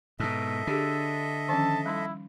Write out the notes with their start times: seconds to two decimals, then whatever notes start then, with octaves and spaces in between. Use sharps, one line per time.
0.20 G#2 B2 A4 D#5 E5
0.67 D3 D4 G4 G#4
1.49 D#3 F3 C#4 A5
1.86 G3 D#4 E4 B5